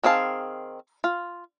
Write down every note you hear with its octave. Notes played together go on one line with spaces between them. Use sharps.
D#3 C4 G#4 F5 A5
F4